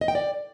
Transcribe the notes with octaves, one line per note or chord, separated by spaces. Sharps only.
D#5
G5
D5